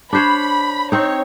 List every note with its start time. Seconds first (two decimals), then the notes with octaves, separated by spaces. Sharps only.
0.13 D4 C5 C#5 B5
0.92 C4 D#4 C#5